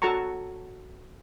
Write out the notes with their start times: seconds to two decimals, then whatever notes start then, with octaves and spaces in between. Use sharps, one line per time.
0.02 F#4 A4 A5 A#5 C#6